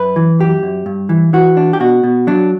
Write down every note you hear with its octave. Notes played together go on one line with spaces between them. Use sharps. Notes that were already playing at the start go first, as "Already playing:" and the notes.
Already playing: F#2 B4
E3
F#2 G4
F#2
G2
E3
E3 F#4
D4
G4
B2 F#4
B2
F#3 D4